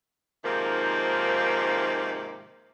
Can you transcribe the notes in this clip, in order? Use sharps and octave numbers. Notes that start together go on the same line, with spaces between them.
G#2 C3 D#3 F3 A#3